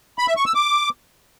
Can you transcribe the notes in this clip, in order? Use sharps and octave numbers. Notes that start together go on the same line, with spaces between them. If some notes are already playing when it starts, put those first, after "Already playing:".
B5
E5
C#6
E6
D6